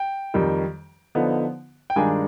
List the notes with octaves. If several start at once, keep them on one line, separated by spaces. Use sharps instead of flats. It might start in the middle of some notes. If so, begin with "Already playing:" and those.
Already playing: G5
F2 D#3 G3
D3 F3 B3 D#4
G5
G2 D#3 G#3 D4 F4 G#5